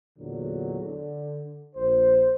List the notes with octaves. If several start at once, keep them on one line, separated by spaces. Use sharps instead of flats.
E2 A#2 D3 F#3
D3
A#1 C5